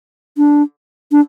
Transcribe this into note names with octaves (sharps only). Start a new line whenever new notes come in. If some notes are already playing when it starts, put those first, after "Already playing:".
D4
D4